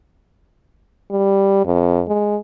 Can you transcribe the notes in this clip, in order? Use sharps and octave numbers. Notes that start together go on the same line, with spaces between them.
G3
F2
G#3